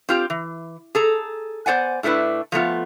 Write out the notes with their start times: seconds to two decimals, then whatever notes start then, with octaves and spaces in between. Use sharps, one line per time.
0.09 C4 F4 G4
0.30 E3
0.95 G#4 A4 A#5
1.66 B3 C5 D5 F#5 G#5
2.03 A2 A3 D4 E4 B4
2.52 F3 A3 B3 F4